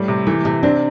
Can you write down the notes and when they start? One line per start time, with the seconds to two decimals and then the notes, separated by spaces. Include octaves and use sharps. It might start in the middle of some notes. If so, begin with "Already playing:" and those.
Already playing: A2 G3
0.08 C3
0.27 E3 A3
0.45 C3 A3
0.63 C4 D4